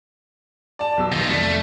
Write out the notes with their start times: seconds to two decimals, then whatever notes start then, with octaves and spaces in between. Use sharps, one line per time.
0.79 D5 A5
0.97 B1 B2 E6
1.13 D#3 F4
1.28 F1 A3 D5